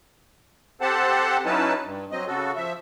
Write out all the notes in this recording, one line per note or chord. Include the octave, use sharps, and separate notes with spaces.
C4 G4 A4 C5 F#5 A5
F#3 C#4 D#4 E4 B4 A5
G2
F#3 C4 D#5
C#3 F#4 A4
F3 E5